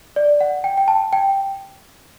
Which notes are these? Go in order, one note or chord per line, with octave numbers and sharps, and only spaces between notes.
D5
F#5
G5
G5
A5
G5